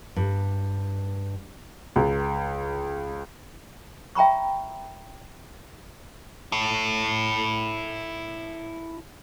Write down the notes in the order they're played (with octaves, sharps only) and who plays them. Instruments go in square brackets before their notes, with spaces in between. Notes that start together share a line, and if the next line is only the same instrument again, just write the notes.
[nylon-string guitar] G2
[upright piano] C#2
[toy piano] E5 G5 A#5 B5 C#6
[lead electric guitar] E4 A4